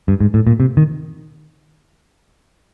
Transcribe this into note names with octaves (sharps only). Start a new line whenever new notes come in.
G2
G#2
A2
A#2
C3
D#3